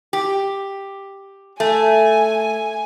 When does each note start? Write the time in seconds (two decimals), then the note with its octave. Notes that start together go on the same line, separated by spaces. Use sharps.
0.13 G4
1.60 A3 G#5